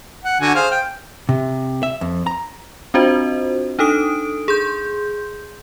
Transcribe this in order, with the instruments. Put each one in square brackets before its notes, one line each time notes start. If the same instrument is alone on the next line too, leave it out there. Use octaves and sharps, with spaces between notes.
[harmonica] F#5
D3 F#4 G#5
G#4 C5 F5
G5
[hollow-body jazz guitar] C3
E5
F2
A#5
[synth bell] C4 D4 F4 F#4 C5 D#5
D4 D#4 A4 D#6 D7
G#4 C6 G6